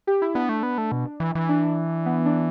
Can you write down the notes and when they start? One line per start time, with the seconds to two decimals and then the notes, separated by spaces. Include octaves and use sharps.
0.07 G4
0.22 E4
0.34 B3 D4
0.49 A3
0.63 B3
0.78 A3
0.92 B2
1.20 E3
1.35 E3
1.49 D4
2.06 B3
2.26 D4